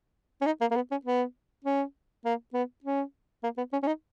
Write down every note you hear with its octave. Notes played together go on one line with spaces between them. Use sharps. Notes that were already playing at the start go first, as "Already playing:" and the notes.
C#4
D#4
A#3
A#3
B3
C#4
B3
C#4
A#3
B3
C#4
A#3
B3
C#4
C#4
D#4